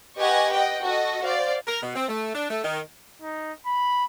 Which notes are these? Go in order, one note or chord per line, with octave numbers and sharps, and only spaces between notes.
G4 B4 D#5 F#5 G#5 C#6
D#5 F#5 G5
F#4 A4 D#5
C5 D5 F5
A#4
B2
C4
A3
D4
A3
D#3
D#4
B5